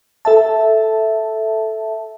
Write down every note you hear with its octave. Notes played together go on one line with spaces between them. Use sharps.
A4 E5 A5